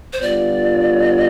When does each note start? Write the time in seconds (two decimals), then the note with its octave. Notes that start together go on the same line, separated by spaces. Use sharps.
0.13 C5
0.22 D3 G3 B3 F4 D5